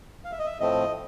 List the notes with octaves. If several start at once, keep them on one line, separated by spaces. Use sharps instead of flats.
F5
E5
D#5
E5
A2 F3 A3 C4 D#5